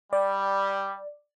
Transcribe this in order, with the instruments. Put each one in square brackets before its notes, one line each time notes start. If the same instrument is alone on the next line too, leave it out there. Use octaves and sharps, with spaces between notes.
[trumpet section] G3 [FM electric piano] D5